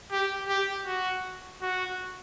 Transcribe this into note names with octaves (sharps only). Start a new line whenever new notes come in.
G4
G4
F#4
F#4